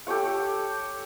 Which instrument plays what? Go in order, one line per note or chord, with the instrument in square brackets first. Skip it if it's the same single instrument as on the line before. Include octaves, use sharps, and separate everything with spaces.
[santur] G4 A4 C#5 F#5